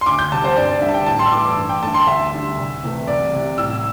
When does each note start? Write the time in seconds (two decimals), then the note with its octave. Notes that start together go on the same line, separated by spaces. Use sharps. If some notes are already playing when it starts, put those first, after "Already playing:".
0.01 C6
0.06 D2 D6
0.19 G6
0.32 C3 G3 A5
0.44 C5
0.56 G2 D5
0.68 D5
0.81 D3 G3 E5
0.89 A5
0.94 G5
1.06 A2 A5
1.19 C6
1.26 E6
1.32 E3 A3 D6
1.45 D6
1.56 G2
1.69 G5
1.82 D3 A3 A5
1.94 C6
2.07 D2 E5
2.32 D3 G3
2.57 C2
2.83 C3 E3 A3
3.08 C2 D5
3.33 C3 G3
3.58 A2 E6